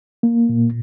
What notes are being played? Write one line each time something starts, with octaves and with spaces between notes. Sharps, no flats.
A#3
A#2